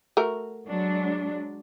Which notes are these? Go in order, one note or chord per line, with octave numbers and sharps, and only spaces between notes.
A3 F#4 A#4
F#3 G#3 D4